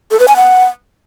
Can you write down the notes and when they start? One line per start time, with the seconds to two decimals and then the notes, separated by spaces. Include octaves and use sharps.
0.11 A4
0.20 B4
0.28 G#5
0.36 F#5